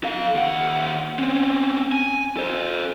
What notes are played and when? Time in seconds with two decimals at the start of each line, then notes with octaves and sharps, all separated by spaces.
0.04 A4 F5
0.34 D#2 F#5
1.19 C4 C#4
1.92 G#5
2.37 A4 C5